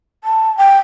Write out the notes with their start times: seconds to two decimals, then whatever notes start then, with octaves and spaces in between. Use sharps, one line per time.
0.24 A5
0.57 G5